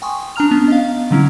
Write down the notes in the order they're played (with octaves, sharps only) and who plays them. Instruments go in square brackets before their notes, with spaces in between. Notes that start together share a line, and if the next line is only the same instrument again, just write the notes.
[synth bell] G5 G#5 C6 C#6 D#6
D4 A5 A#5 F6 F7
B3 C#4
D#5 F5
D3 F#3 C#4 E4